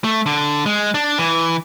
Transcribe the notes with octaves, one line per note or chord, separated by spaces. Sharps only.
A3
D3
G#3
D4
E3